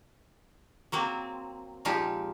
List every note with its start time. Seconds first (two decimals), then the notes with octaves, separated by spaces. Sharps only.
0.92 F#3 A#3 C4
1.85 A#2 F3 G#3 D#4 F4 G4